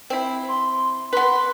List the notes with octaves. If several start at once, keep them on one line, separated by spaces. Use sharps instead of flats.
C4 E4
C6
B3 B4 C6